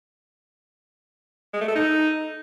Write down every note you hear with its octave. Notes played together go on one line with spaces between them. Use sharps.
G#3
A3
A4
D#4